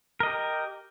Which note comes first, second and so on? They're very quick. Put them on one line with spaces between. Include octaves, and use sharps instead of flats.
A#4 D#5 G4